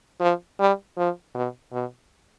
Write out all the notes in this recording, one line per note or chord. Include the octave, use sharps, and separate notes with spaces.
F3
G3
F3
B2
B2